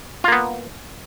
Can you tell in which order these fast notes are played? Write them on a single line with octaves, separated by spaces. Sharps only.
F4 A#3 B3